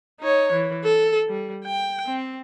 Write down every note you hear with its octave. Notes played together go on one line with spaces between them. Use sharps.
D#4 C#5
E3
A4
G3
G5
C4